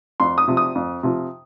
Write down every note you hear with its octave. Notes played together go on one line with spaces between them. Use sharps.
F2 C6
D#6
C3 F3
D#6
F2
C3 F3